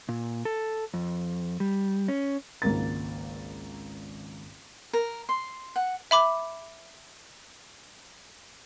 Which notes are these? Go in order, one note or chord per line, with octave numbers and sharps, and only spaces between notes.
A#2
A4
F2
G3
C#4
G#1 C#2 A#3 A6
A#4
C6
F#5
E5 B5 D6